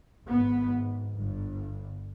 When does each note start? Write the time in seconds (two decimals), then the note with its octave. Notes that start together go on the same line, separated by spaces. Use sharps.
0.26 G#1 G#2 B3
1.15 G1 G2